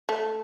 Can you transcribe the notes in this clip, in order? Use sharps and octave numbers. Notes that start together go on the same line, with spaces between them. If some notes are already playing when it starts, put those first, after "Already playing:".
A3